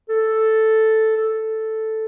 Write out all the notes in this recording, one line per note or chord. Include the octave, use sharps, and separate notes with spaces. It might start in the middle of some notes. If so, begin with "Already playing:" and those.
A4
A4